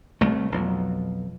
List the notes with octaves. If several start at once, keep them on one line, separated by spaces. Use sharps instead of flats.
C2 A3
B1 F2